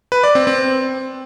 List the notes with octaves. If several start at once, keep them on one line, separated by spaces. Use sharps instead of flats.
B4
D5
C4
C4